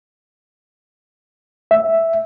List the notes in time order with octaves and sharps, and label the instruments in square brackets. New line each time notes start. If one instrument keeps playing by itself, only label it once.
[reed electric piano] E5